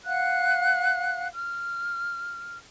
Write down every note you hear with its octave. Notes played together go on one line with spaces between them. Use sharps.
F5 F#5 F#6
F6